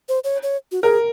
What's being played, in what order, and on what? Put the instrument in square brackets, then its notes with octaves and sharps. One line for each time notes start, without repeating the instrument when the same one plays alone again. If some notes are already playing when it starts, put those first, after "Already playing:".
[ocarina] C5
C#5
C#5
F#4
[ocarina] G#4 [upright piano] A#4